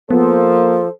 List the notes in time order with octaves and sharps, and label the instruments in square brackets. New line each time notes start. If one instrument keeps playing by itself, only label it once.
[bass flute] F3 [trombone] A#3 [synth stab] B3 [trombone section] A4 C5